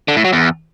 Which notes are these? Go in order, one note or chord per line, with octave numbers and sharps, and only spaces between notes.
D3
A2
F#3
E2